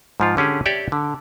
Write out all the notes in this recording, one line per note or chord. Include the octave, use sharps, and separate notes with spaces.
G#2 F3 F4
D3 C#4 G4 G#4
G4 C#5 D5 E5 G5
D3